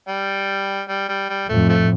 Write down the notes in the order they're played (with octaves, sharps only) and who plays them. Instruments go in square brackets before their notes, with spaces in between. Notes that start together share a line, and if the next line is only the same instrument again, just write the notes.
[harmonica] G3
G3
G3
G3
[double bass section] F2 A2 [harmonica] A3
[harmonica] F3 A3